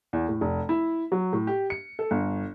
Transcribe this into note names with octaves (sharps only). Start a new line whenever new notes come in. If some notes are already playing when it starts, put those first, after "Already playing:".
E2
A2
F1
E4
F#3
A2
G4
C#7
A4
G1